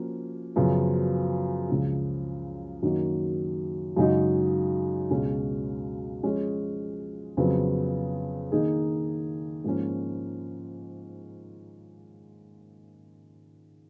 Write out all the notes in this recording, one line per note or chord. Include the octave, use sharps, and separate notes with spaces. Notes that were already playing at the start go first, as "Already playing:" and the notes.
Already playing: F3 A#3 C#4 F#4
F#2 C#3 F3 B3
C#2 C#3 F3
F#2 D#3 A#3 D#4 F#4
F#2 C#3 G#3 D#4 F#4
C#2 B2 G#3 C#4
F3 G#3 C#4 G#4 C#5
F2 C#3 F#3 B3
D#3 A#3 D#4 G#4
G#2 F3 A#3 C#4